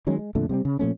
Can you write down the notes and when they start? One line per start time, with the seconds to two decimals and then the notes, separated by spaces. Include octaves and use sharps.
0.07 D#3 F#3 G#3 C#4
0.19 G#3
0.35 F2 A#2 D3 A3
0.49 C3 G3 A#3 C4
0.65 C#3
0.79 A#2 F3 A3 C#4